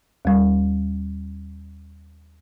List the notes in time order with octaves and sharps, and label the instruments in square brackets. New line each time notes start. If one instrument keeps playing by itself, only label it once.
[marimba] D#2 G3